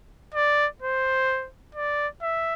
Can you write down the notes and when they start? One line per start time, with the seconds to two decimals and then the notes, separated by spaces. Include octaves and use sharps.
0.35 D5
0.82 C5
1.75 D5
2.22 E5